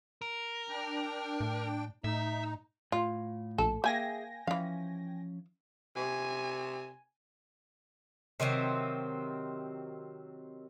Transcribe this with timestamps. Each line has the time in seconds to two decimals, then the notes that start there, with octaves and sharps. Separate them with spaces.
0.22 A#4
0.69 D4 G5
1.40 A2
2.04 A2 D#4 E5
2.92 A2 F4
3.58 A#1 A4
3.84 A#3 G#4 E5 G5 G#5 A#6
4.47 E3 F3 C#4 F5
5.96 C3 G#5
8.40 C3 D#3 F#3 C4